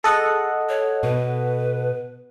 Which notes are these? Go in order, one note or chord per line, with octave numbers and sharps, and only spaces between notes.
G#4 A4 D#5 F#5
C#5
B2 B4